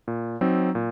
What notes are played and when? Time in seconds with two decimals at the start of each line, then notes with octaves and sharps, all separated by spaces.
0.08 A#2
0.41 F#3 C4 D#4
0.75 A#2